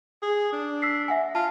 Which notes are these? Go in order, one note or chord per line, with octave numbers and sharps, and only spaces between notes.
G#4
D4
E6 B6 C7
E5 F#5 G#5
F4 A5